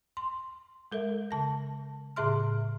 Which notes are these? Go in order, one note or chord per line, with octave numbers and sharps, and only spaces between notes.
C6
G#3 A4 A#4 E5
C#3 A5 A#6
A2 C#3 G#4 E5 C6 F6